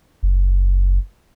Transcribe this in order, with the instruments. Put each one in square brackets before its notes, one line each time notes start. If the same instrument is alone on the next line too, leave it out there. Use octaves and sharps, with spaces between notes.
[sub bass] F#1